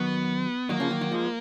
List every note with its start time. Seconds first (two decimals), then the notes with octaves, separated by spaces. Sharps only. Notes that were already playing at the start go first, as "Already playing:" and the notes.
Already playing: D#3 F#3 B3
0.69 D#3 F#3 A#3
0.80 C#3 F3
0.91 D#3 F#3
1.01 D#3 F#3
1.12 F3 G#3